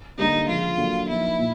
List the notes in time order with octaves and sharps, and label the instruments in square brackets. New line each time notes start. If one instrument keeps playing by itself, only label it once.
[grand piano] D3 G3 A#3 D4 [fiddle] D#4
[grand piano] C#3 F3 G#3 [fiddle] F4
[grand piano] F#3 A#3 D4 F#4 A4
[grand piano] F3 A#3 D#4 [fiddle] E4
[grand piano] A#2